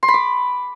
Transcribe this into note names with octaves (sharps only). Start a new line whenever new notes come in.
C6
B5
D6